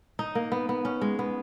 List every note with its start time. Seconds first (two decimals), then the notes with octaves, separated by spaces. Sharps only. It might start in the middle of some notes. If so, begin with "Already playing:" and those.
0.19 D#4
0.35 A#3
0.52 B3
0.69 B3
0.85 C#4
1.01 G#3
1.19 B3